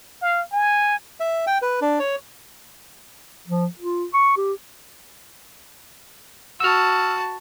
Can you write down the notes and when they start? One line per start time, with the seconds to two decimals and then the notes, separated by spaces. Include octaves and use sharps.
0.22 F5
0.52 G#5
1.20 E5
1.47 G5
1.62 B4
1.82 D4
1.99 C#5
3.47 F3
3.79 F4
4.14 C#6
4.37 G4
6.60 F#4 A5 E6 F6